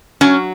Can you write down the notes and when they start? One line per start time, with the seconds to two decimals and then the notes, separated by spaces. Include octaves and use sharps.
0.21 F#3 C#4